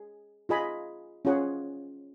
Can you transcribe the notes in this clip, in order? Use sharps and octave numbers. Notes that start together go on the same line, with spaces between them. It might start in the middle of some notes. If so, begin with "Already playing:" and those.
Already playing: G#4
F4 G#4 D#5 G#5 B5
C#4 F4 G#4 C#5 F#5